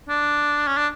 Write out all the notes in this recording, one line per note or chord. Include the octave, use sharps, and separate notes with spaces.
D4
C#4
D4